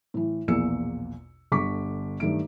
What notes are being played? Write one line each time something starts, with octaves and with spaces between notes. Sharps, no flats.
A2 E3
A#1 E2 B2 A#3 E6 C#7
G1 D3 C#6 D6 B6
G2 D#3 A3 D7